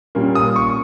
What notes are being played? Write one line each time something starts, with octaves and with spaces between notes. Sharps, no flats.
A#2 G3 A#3 C#4
D#6
C#6